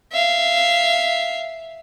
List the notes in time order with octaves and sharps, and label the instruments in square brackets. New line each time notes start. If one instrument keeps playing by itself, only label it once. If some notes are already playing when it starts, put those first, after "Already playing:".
[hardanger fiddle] E5 F5